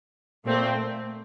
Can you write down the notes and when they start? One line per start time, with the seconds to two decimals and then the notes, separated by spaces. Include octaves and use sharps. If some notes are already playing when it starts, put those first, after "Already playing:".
0.45 A#2 A3 C4